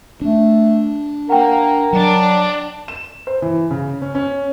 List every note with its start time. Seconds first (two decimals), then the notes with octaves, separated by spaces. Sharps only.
0.21 A3 D4
1.30 A#3 A#4 F#5 G5
1.93 F#3 D4
2.88 E7
3.27 C5
3.42 E3
3.71 C#3
4.02 C#4
4.15 C#4